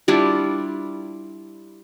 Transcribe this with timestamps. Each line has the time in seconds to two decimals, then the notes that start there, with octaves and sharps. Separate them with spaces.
0.08 G3 D4 E4 F4